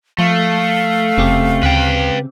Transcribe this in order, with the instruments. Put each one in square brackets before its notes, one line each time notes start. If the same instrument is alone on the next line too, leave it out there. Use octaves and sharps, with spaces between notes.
[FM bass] F3 [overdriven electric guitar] A3 [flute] F5
[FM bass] F1 [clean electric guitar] C#3 C4 G4
[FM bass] D2 [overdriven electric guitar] B4 G5